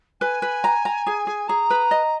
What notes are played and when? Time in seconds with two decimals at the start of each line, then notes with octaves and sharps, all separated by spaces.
0.21 B4 G#5
0.42 B4
0.64 A#5
0.85 A#5
1.07 G#4
1.27 G#4
1.48 G#4 A#5
1.70 B4
1.91 D#5